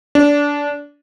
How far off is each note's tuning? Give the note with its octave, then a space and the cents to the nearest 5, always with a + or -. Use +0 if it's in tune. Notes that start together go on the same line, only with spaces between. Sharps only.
D4 -20